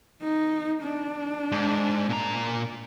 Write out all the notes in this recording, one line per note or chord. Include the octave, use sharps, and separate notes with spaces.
D#4
D4
G#2
A#2 A#5